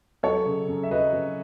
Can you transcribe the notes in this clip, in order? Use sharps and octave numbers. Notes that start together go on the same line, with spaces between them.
F#3 A4 C#5
C#3
F#2
E5
F#3 B4 D#5
F#2